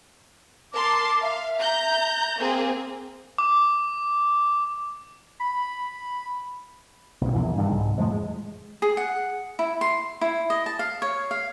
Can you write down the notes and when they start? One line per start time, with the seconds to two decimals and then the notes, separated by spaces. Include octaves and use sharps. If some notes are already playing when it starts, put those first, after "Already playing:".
0.73 A#4 A5 C6 D6
1.21 E5 F5
1.59 A#5 G6
2.39 A#3 C4 G#4 C5
3.38 D6
5.40 B5
7.21 B1 B2
7.33 A#1 E2 E3
7.58 G2 D#3
7.70 C2 G#2
7.98 F2 A2 F3 G#3
8.11 G#3
8.82 G#4
8.97 F#5
9.59 E4
9.81 C6
10.21 E4
10.50 D#5
10.66 A5
10.79 F5
11.02 C#5
11.31 F5